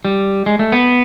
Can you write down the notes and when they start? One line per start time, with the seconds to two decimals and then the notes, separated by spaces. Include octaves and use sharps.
0.05 G3
0.46 G#3
0.59 A3
0.72 B3